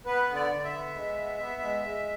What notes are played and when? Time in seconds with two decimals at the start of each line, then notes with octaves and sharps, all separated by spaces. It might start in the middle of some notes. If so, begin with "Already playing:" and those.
0.06 B3 B4
0.29 D3
0.36 D5
0.51 D3
0.65 E5
0.72 B3
0.95 G#3
1.18 B3
1.39 B3
1.61 G#3
1.83 G#3